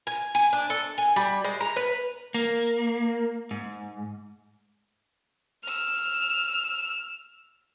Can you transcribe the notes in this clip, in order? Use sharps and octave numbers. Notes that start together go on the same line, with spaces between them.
G#5
G#5
D4
A4
G#5
G3
G#3
A#5
B4
A#3
G#2
E6 F6